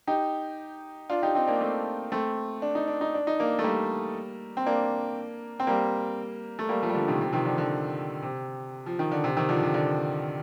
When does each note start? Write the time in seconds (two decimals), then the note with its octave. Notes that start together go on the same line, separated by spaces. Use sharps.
0.07 D#4 G4
1.10 D4 F4
1.23 D#4 G4
1.35 C4 D#4
1.47 A#3 D4
1.60 A3 C4
2.12 A3 C4
2.62 D4
2.75 D#4
2.88 D4
3.01 D#4
3.14 D4
3.27 D#4
3.39 A#3 D4
3.59 A3
3.64 G3 A#3
4.57 C4
4.66 A#3 D4
5.60 C4
5.67 G3 A#3
6.59 A3
6.69 G3 A#3
6.83 F3 A3
6.89 G3
6.94 D3 F3
7.08 C3 D#3
7.21 C3
7.27 F3
7.33 C3 D#3
7.45 D3 F3
7.58 D3
8.22 C3
8.86 F3
8.99 D#3
9.12 D3
9.24 C3
9.37 C3 D#3
9.49 D3 F3
9.63 C3
9.74 D3